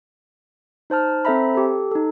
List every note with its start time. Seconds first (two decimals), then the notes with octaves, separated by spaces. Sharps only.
0.90 D#4 C5 A5 F6
1.25 C4 A4 C5 E5 A#5 B5
1.55 G4 A4
1.92 D#4 A4